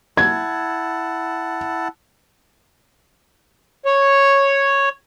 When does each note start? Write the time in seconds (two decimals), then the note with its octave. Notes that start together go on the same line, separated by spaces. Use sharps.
0.17 E4 F#5 A5 G#6
3.86 C#5